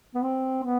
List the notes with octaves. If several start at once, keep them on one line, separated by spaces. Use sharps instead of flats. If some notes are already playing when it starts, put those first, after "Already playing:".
B3
C4
B3